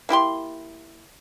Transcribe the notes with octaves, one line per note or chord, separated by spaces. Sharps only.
A#3 E4 G4 C6